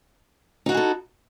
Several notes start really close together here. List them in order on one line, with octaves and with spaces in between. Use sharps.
D#4 F#4 E4 G#4 A4